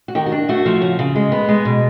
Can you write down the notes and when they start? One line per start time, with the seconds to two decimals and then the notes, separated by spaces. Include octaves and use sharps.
0.08 F#4
0.15 D#3 G4
0.26 F#4
0.32 D4
0.49 A3 F#4
0.66 F3
0.82 C#3
0.99 C#3
1.15 G#3
1.32 B3
1.49 G#3
1.65 B2